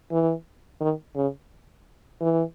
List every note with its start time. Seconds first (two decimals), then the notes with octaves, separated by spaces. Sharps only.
0.11 E3
0.81 D#3
1.16 C#3
2.21 E3